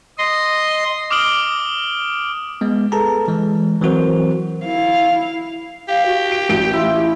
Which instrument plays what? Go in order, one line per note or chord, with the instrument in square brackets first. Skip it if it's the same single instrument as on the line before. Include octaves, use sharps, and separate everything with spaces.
[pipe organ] D#5 C6
[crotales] D6 D#6 F6 D7 F#7 G7
[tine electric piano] G#3 B3
G#4 A4 B4 A5 A#5
E3 G#3
E3 F#3 C4 F#4 A#4 C5
[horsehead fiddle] E4 F5
[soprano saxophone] G4 [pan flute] F5
[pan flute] F#4
[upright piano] D7
A1 D7
[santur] E4 F4